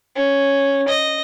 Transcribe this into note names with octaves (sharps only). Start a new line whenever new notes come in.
C#4
D#5